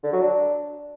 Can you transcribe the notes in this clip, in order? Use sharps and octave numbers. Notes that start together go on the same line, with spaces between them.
D3
F#3
D4